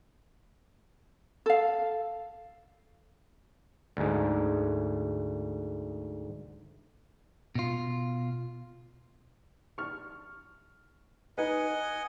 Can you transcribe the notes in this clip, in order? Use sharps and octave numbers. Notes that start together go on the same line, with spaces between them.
A4 F5
D2 G#2
B2 F4
C#6 F6
D#4 B4 D#5 F#5 G#5